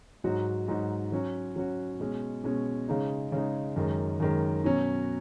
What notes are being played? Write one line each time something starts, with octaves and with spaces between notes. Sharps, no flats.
G#2 F#3 D#4 F#4
G#2 F#3 D#4 F#4
F#3 C#4 F#4
F#3 C#4 F#4
B2 G#3 C#4
B2 G#3 C#4
C#3 G#3 D#4
C#3 G#3 D#4
F#2 D#3 G#3
F#2 D#3 G#3
B2 F#3 C#4